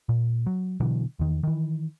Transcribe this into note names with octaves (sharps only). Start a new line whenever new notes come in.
A#2
F#3
B2 D3 E3 F#3
E2 D#3
D#3 E3